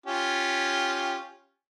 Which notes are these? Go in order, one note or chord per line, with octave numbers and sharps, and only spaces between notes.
C#4 F4 G4